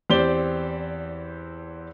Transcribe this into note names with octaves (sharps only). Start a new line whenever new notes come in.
E2 C4 G4 C5 D5 G7